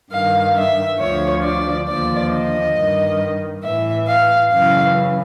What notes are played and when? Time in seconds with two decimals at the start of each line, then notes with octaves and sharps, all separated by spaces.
0.12 G2 D#3 F5
0.56 E5
0.99 D2 D3 F3 C#5
1.43 D5
1.87 D#2 D3 F3 D5
2.32 D#5
2.75 G2 D#3
3.63 A2 E3 E5
4.07 F5
4.50 F#2 C#3 E3 F5